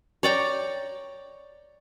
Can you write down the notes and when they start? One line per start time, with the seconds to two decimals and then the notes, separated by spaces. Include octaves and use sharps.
0.23 C#5 D5 G5 A#5